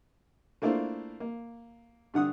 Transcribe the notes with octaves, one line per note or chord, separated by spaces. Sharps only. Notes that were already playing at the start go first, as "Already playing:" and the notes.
A3 A#3 D4 E4 F4 C5
A#3
G2 D3 F#5 D#6